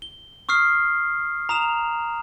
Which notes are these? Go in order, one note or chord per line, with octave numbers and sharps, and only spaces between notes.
G7
C#6 D#6 F6 C7
A#5 D#6 E7 F7